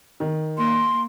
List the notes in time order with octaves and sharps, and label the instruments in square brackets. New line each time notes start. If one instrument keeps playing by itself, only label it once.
[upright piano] D#3
[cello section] A#3 [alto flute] C6